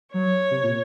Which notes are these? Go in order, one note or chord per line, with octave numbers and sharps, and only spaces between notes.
F#3 C#5
C3
A#2